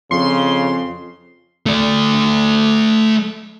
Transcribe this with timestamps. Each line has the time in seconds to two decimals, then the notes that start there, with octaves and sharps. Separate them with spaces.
0.11 F2 C#3 C6
1.66 A3 D5